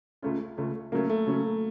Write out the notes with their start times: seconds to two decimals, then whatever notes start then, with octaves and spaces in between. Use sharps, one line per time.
0.22 C#2 C#3 A3 C#4 F4
0.57 C#2 C#3 A3 C#4 F4
0.92 C#3 F#3 A3 A#3 C#4
1.09 A3
1.27 C#3 F#3 A3 C#4